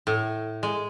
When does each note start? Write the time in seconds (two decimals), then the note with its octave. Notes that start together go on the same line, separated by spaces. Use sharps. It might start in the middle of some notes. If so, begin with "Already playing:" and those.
0.07 A2
0.63 G#3